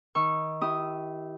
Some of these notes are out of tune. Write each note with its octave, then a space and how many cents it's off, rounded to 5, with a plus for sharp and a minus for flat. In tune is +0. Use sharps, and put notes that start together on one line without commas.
D#3 +20 C#6 -10 E6 +25
E4 -10 G4 -20 D#6 +0